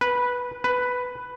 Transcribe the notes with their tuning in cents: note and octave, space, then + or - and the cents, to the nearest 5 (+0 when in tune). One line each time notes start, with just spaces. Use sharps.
B4 -10
B4 +5